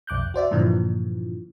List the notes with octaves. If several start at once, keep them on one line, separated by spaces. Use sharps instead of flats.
B1 F2 D6 F#6 G6
F#4 C5 D5 E5
G2 A#2 D3 E3 F3